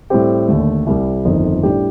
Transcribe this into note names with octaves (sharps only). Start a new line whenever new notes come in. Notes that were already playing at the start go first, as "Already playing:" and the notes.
A2 G3 C4 G4
D#2 D3 A3
C2 C3 G3
G1 F2 D#3
A2 G3 D4 G4